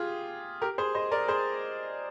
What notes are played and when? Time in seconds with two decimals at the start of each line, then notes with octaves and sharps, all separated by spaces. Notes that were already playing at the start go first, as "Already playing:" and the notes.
Already playing: F4 G4 G#4
0.62 G4 A#4
0.78 G#4 C5
0.95 C5 D#5
1.11 A#4 D5
1.28 G#4 C5